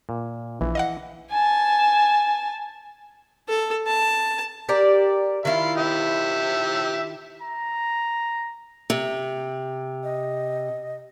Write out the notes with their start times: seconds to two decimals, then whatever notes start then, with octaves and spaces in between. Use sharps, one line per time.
0.09 A#2
0.61 A#1 E3
0.75 D#5 F5 F#5
1.31 G#5 A5
3.48 A4
3.87 A5
4.69 G4 A#4 D5
5.45 D#3 E4 F4 F5
5.78 G4 E5
7.42 A#5
8.90 C3
10.04 D#5